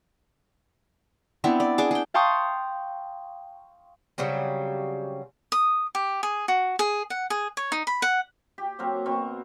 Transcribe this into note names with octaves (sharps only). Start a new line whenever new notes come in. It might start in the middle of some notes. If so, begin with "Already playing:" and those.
B3 C4 D4 E4
D5
D4 G#4 D6
G#4 G5
F5 G5 A5 C6 C#6 D#6
C#3 F#3 G3 C4
D#6
G4
G#4
F#4
G#4
F#5
G#4
C#5
D#4
B5
F#5
G4
F#3 A#3 C4 A#4
B2 C4 A#4 C#6